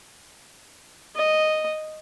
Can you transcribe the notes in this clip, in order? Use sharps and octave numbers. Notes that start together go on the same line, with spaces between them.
D#5